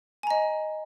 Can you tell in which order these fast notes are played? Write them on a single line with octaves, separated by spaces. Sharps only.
G#5 A#5 D#5